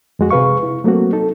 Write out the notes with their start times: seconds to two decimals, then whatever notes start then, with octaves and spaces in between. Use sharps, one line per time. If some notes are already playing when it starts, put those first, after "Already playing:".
0.19 F2 G#3 F#4
0.31 C3 G#4 B4 F5 C#6
0.63 E4
0.84 F#3 A3 A#3 C4 F#4
1.13 D#4 A4